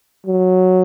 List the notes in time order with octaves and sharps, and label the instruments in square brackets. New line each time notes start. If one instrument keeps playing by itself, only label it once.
[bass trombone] F#3